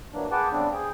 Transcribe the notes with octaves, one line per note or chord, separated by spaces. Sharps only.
E3 F#3 A#3 D4
G#4 B4 F#5 G5 A5 D6
C#3 G3 B3 C4 D4
G#4 G5